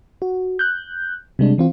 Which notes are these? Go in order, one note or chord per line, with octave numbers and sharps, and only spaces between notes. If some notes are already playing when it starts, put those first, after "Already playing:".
F#4
F#6 G6
C3 G3 G#3 D4
E3 C4 F4